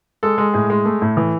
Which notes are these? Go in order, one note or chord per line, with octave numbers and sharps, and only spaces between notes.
G#3 A4
G#3
A2 G#4
G#3
A3
A2
E3